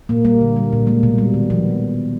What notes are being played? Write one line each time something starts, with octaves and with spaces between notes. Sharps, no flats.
A#2 A#3
G3 A#3
D3
G3
A#2
G#3 A#3
B2
G3
D#3
F3 B3